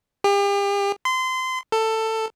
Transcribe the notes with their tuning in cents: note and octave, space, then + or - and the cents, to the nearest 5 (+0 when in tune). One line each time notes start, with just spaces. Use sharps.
G4 +40
C6 -25
A4 +15